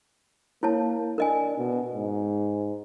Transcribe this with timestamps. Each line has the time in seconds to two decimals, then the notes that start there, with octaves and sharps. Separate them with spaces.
0.63 A#3 E4 C#5 A5
1.18 D4 A#4 D#5 G#5
1.58 B2
1.94 G#2